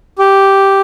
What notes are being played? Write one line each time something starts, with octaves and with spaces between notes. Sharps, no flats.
G4